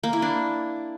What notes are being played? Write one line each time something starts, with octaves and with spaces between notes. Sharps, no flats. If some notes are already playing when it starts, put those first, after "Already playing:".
A#3
E4
D4